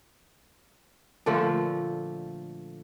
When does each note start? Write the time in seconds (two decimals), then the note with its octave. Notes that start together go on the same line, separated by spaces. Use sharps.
1.26 A#2 D3 F3 A3